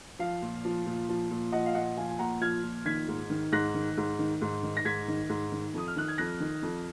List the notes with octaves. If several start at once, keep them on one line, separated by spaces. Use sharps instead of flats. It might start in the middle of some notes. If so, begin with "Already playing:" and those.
F3 F5
A#2
F3
A#2
F3
A#2
F3 D#5 F#5
F5
A#2 D#5 F#5
F3 F5 G#5
G#5
A#2 F#5 A#5
F3 F6 G#6
A#2
D#3 G#6 B6
G#2
D#3
G#2 F#6 A#6
D#3
G#2
D#3
G#2
D#3
A#6
G#2 G#6 B6
D#3
G#2
D#3
F2 D#6
F6
D#3 F#6
G#6
F2 F#6 A#6
D#3
F2